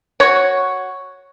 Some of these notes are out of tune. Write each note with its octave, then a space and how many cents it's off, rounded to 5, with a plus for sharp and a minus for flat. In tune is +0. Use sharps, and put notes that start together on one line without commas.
F#4 +0 C#5 +0